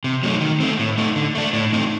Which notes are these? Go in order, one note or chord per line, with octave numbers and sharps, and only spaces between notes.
C3
F#3 A3 D#4
D#3
A3 C4
A2
A3 D#4
D3
A3 D4
A2
A3 C4 D#4